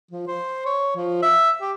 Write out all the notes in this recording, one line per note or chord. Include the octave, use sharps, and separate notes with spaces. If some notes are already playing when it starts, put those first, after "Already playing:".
F3
C5
C#5
F3
E5
G4